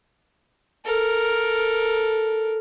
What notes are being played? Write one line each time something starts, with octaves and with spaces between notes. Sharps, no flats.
A4 A#4